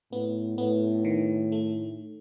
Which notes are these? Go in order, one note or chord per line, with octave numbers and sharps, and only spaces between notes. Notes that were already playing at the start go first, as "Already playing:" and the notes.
A2 B3
A2 B3
D#3
A3